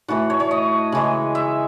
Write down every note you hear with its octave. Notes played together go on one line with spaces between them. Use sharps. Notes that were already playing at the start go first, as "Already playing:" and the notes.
A2 E3 A3 F#4
C#5
C#5
D#5
C#3 E3 G#3
E5